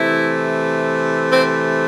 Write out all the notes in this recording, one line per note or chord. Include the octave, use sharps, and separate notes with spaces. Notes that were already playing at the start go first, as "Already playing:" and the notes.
Already playing: C3 E3 A3 E4
C4